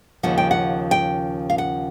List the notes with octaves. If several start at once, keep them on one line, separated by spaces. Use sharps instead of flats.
D#2 C#3 F3 F#5
G5
F#5
G5
F5
F#5